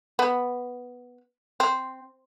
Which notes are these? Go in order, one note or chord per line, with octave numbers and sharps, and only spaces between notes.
B3
C4